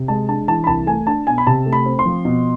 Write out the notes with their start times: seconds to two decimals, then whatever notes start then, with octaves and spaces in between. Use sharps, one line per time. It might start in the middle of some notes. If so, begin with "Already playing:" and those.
Already playing: C3
0.08 G#3 A5
0.28 D4 A5
0.48 E3 A5
0.64 B5
0.67 C2 A5
0.87 A3 G#5
1.07 D4 A5
1.27 B2 G#5
1.38 B5
1.47 C3 A5
1.66 A3
1.73 B5
1.86 C4
1.99 C6
2.06 F3
2.25 B2